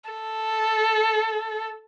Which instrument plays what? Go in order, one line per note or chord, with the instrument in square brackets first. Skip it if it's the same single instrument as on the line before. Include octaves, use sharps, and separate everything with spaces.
[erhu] A4